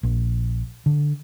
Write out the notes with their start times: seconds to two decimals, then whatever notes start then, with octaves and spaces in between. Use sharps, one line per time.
0.03 A#1
0.86 D3